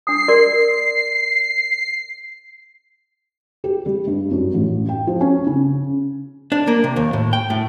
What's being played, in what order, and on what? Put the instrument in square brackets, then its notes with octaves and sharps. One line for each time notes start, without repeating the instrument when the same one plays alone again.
[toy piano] D4 D#6 [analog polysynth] C7
[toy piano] A#4 D5 C6
[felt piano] G4
G3
G2
F#2
A1
G5
F3
C#4
C#3
[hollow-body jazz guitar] D4
A#3
C3
D#2
A2
G5
A2